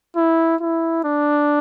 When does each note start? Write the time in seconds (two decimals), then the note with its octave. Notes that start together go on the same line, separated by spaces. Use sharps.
0.16 E4
0.61 E4
1.05 D4